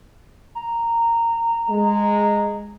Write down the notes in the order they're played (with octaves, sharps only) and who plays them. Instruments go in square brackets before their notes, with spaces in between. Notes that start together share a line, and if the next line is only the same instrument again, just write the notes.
[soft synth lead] A#5
[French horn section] G#3